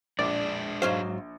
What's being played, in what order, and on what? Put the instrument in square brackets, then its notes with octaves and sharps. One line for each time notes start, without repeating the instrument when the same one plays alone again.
[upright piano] A#1 [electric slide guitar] G#3 D4 [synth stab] D5
[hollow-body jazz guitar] G#2 F#3 C5 [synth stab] F5